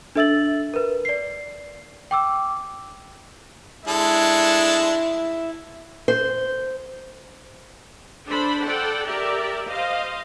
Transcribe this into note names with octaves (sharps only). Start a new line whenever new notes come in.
D4 A4 E5 E6 A6 F#7
A#4 B4
D5 C7
G5 D6 E6
G#3 D4 E4 A4
C5
D4 A4 C5 B5
A4 D5 F#5 G5
G4 A#4 D5 E5
C5 D#5 F5